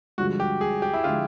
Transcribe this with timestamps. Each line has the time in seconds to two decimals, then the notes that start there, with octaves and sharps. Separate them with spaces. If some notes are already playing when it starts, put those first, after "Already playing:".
0.18 G2 D3 F3 G#3 F#4
0.40 G4
0.61 G#4
0.82 G4
0.93 E4
1.04 D3 F3 G#3 F4